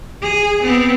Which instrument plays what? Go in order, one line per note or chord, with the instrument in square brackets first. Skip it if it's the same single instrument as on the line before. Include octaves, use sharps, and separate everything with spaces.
[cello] G#4
B3 C4